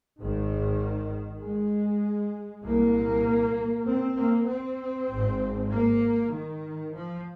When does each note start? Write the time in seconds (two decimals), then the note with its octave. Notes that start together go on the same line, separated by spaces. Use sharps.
0.19 G#1 G#2 D#3
1.41 G#3
2.64 C2 A#2 A#3
3.86 C4
4.17 A#3
4.48 C4
5.09 G#1 G#2
5.71 A#3
6.32 D#3
6.93 F3